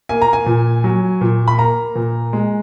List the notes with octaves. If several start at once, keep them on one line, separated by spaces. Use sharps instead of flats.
A#3 G#5
A#5
G#5
A#2
F#3
A#2
B5
A#3 A#5
A#2
G#3